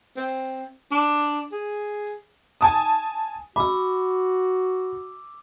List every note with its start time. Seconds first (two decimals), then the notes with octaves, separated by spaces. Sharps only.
0.17 C4
0.92 D4
1.52 G#4
2.61 G#5 A5 D#6
3.56 F#4 B5 D6 E6